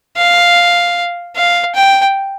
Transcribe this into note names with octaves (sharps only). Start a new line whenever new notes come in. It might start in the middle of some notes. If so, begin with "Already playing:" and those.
F5
F5
G5